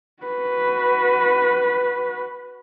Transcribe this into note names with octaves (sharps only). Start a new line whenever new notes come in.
F#4 B4